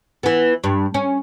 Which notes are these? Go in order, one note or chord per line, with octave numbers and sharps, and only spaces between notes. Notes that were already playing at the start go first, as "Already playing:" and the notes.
E3 B3
G2
C#4